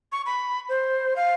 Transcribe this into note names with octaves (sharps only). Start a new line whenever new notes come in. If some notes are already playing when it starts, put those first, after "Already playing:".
C#6
B5
C5
F5